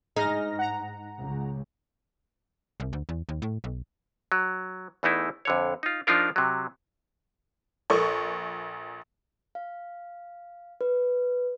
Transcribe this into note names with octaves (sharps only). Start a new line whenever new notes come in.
G#2 D#4 G#4 F6 A#6
F#5 A#5
C#2
C2
D2
E2
D#2
A2
B1
F#3
E2 E3 A3 D#4 E4
F2 D3 C#5
D#4 F4
F3 D4 D#4 F4 A#4
C3 F#3
A#1 A4 A#4 D5 C#6
F5
B4